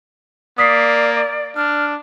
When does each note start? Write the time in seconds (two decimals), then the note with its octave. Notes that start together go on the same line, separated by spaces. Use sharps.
0.58 A#3 D5 D#6 B6 C7
1.56 D4 F6